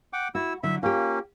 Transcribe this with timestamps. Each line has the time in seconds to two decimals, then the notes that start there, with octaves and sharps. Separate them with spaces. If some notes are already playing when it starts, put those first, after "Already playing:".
0.13 F#5 G5 D6
0.35 E4 F#4 E6
0.63 D3 F#3 E4 E5
0.83 A#3 C#4 F4 G4